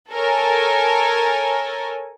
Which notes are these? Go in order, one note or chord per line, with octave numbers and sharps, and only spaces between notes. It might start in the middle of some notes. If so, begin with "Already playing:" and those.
A4 A#4 C#5 G#5